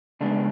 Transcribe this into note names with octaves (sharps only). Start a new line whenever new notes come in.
C#3 G#3 B3 D4